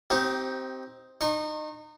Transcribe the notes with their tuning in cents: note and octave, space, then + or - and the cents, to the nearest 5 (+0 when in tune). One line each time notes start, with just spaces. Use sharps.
C4 +0 D#4 +10 G4 -20
D#4 -30 C#6 -40